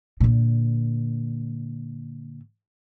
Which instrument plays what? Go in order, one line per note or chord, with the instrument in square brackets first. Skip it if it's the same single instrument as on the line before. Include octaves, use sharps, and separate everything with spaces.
[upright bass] A#2 D3